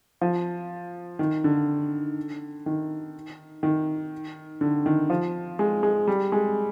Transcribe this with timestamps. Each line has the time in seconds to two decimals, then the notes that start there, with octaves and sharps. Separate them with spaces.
0.21 F3
1.19 D#3
1.44 D3
2.66 D#3
3.63 D#3
4.61 D3
4.86 D#3
5.10 F3
5.59 G#3
5.83 G#3
6.07 G3
6.32 G#3